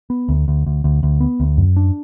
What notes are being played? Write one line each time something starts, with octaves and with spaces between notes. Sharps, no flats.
B3
D2
D2
D2
D2
D2
B3
D2
F#2
D4